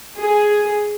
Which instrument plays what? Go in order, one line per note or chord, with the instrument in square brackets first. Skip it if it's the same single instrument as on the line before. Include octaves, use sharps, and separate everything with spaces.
[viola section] G#4